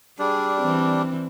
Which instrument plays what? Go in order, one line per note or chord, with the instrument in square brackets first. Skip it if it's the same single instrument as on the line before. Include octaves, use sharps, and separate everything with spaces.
[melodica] G3 D4 [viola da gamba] G#4
[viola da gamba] E3 C4